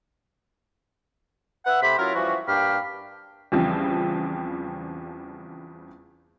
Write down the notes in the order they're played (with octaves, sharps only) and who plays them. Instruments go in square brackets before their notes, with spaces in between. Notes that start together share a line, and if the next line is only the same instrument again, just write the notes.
[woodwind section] B4 E5 F#5
C3 A3 G4 C5 B5
F#3 C#4 E4 F4 A#4
E3 F3 G3 C#4 F#4
G2 A#3 D4 G5 B5 F6
[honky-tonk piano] E2 C#3 F3 G3 C4